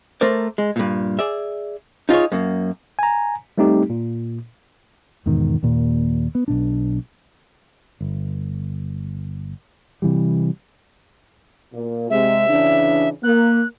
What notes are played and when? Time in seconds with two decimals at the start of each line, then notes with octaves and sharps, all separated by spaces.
0.21 A3 A#4 C5 D5
0.58 G#3
0.76 G2 A#2
1.19 G#4 D5 E5
2.09 D#4 F4 G4 G#4 C#5
2.32 F#2 A#3
2.99 G#5 A#5
3.58 G3 A3 C4 D#4 G4
3.90 A#2
5.26 E2 G#2 B2 D#3
5.63 D#2 A#2
6.35 B3
6.48 B1 B2 D4
8.01 G1
10.02 C3 E3 G3
11.73 A#2
12.10 C3 G#3 E5
12.49 C#3 E3 D4
13.23 A#3 F#6